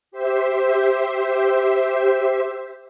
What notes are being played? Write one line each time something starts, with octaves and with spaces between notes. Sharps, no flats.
G4 C5 E5